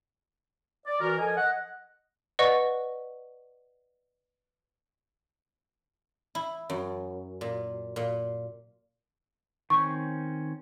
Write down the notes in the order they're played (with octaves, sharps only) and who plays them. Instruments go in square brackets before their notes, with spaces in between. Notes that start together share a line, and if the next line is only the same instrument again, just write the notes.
[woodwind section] D5
E3 F#4 A#4
F3 A4 A#4 D#5 G#5
D#5 F#5
[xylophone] B4 D5 D#5 F#5 C#6
[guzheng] E4
F#2
A#2
A#2
[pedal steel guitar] D#3 C4 C#4 [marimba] C#6